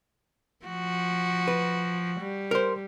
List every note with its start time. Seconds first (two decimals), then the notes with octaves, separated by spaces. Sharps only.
0.66 F3 F#4
1.48 B4
2.20 G3
2.51 A#4 C5